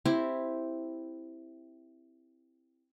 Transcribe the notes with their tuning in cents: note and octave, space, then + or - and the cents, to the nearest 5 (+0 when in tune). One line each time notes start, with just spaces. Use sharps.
C4 +0 E4 +0 G4 +0